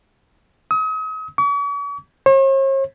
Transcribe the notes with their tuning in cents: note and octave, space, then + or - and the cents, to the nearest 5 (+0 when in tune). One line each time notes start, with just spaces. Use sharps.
D#6 +40
C#6 +45
C#5 -45